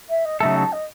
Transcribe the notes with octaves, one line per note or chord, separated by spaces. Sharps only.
E5
D#5
C#3 F#3 A3 D#4 A4 E5
A5
D#5